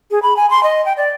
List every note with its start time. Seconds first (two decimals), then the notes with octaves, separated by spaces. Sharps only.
0.11 G#4
0.22 B5
0.37 G#5
0.50 C6
0.63 D#5
0.86 G5
0.97 D5